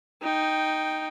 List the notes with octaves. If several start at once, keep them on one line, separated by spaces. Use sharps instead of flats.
D#4 G5